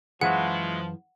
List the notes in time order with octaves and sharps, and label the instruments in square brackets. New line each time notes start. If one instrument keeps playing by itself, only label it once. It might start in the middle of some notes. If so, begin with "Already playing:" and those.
[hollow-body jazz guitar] F#2 E3 G#4 [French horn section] F3 [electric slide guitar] G#3 E4 F#4 [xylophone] F#5